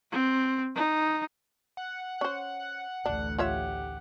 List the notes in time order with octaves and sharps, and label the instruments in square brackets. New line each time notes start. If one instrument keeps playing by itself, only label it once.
[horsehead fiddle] C4
D#4
[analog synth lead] F#5
[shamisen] C#4 C5
[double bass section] A1 D2 [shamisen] D4
[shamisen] F4 C#5 E5 [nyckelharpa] G4 F#5